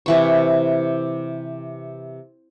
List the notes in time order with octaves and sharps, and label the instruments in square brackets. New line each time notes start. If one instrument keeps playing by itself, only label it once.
[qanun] C3 E3 C#6